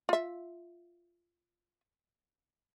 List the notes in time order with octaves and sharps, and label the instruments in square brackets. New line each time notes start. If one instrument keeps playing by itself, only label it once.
[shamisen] F4 E5